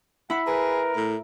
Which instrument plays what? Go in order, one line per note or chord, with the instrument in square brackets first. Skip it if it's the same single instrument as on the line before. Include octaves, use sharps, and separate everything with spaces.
[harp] E4 B5 [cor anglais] F#5
[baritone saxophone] G#4 [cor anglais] A#4 [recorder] B4
[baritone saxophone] A2